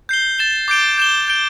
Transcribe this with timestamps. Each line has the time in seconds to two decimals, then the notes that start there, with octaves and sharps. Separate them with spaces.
0.09 G6 C7 G7
0.38 A6 E7 G7
0.68 D6 G6 D7 G7
0.98 G6 E7 G7
1.28 G6 D7 G7